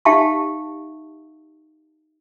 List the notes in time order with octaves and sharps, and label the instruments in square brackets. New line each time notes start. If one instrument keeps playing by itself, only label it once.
[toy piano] D#4 G4 E5 F5 A5 C#6